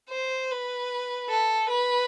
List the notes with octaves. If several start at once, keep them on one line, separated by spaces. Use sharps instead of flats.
C5
B4
A4
B4